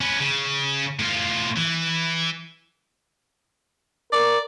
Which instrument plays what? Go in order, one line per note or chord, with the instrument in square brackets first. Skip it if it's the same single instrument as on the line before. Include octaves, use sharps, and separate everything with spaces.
[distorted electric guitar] C#4 B4
C#3
A2 F4
E3
[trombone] A#4 [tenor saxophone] D5